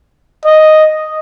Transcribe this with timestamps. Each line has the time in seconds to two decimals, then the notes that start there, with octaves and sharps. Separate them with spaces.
0.45 D#5